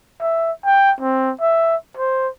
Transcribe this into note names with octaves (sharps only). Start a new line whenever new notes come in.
E5
G5
C4
E5
C5